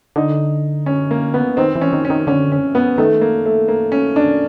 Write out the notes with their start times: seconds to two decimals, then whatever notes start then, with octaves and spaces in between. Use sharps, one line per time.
0.16 D3 D#4
0.86 C#4
1.11 A#3
1.34 B3
1.57 D#3 C4
1.76 E3
1.81 C#4
1.93 D#3
2.05 C#4
2.10 D#3
2.27 D3 C#4
2.52 C#4
2.75 B3
2.98 D#3 A3
3.21 A#3
3.46 A3
3.68 A#3
3.92 C#4
4.16 D4